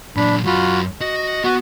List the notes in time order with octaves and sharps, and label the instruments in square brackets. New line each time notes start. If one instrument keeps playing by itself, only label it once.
[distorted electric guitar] A#2 F#3 [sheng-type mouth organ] D4 B5
[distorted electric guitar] F#2 B5 [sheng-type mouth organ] F4 F#4
[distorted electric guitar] F#4 [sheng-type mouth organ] D#5
[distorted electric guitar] B3 [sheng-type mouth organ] F#4